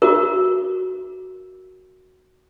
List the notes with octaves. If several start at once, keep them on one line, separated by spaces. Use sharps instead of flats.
F#4 A#4